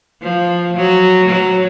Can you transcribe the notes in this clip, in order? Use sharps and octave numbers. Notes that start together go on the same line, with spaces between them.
F3
F#3
F#3